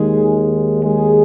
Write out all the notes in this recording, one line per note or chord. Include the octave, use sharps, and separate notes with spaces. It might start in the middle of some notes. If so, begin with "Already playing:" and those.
Already playing: D#2 D#3 G#3 G#4
G#3 G#4